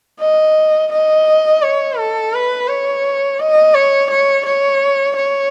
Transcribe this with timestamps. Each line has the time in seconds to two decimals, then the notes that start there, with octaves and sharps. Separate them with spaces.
0.20 D#5
0.92 D#5
1.63 C#5
1.98 A4
2.34 B4
2.68 C#5
3.39 D#5
3.74 C#5
4.10 C#5
4.46 C#5
5.16 C#5